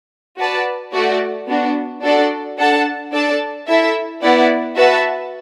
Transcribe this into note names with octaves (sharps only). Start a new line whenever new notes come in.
F#4 B4 D5 A5
A3 F#4 D5
B3 D4 F#4
D4 F#4 A4 D5
D4 A4 F#5 A5
D4 A4 D5 A5
E4 A4 E5
B3 E4 D5 F#5
F#4 B4 E5 A5